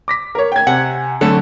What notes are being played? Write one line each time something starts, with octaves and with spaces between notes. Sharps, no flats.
D6 A#6 B6
A#4 C#5
G5 G#6
C3 F#5 G#5
D3 F#3 A3 C4 A4 C#5